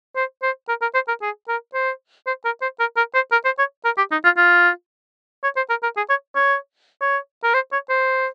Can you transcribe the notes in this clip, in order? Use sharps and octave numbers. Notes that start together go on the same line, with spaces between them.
C5
C5
A#4
A#4
C5
A#4
G#4
A#4
C5
C5
A#4
C5
A#4
A#4
C5
A#4
C5
C#5
A#4
G4
D#4
F4
F4
C#5
C5
A#4
A#4
G#4
C#5
C#5
C#5
A#4
C5
C#5
C5